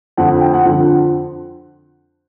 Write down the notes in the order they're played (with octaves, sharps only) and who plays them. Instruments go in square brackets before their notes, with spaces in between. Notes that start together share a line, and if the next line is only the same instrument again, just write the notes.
[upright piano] F2 D3 F3 F#5
G5
F#5
F2 D3 F3